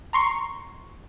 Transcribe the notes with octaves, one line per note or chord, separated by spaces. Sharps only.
A#5 C6 C#6